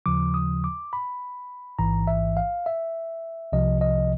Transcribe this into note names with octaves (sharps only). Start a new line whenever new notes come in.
D#2 C#3 F3 D6
D#6
D6
B5
A1 G#2 E3 A#5
E5
F5
E5
C2 C3 F3 D#5
D#5